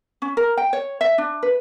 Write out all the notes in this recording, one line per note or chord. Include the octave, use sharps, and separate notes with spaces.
C#4
A#4
G5
C#5
E5
D4
B4